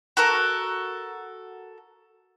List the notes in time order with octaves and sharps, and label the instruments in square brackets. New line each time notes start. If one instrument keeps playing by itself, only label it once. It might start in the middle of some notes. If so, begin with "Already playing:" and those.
[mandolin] F#4 A4 A#4